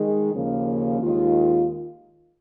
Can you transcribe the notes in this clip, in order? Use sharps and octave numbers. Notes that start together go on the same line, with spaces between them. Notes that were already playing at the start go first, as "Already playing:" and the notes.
Already playing: D#3 G#3 D#4 G#4
D#2 C#3 F3 A#3 C#4
D#2 D#3 G#3 F4